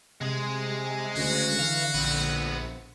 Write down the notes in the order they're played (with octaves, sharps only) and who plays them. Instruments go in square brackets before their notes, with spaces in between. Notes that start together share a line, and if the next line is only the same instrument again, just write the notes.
[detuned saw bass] C3 [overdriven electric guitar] G#3 G#4
[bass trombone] D2 [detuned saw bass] C#3 [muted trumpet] F#4
[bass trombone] D3 [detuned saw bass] E3 [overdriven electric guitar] F5
[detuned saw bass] A#1 [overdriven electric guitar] B3 C4